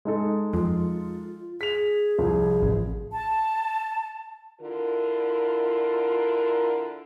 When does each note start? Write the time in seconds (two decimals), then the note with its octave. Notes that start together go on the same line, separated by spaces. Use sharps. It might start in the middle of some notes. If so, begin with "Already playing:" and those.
0.05 G#3 D#4 A4
0.53 F2 F4
1.61 G#4 B6 F7
2.18 C2 F3
2.62 A1
3.12 A5
4.61 D3 E4 F4 A#4